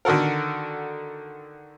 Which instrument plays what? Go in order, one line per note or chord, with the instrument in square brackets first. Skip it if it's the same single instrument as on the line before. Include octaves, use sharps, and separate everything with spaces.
[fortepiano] D3 D#3 F#4 A4 A#4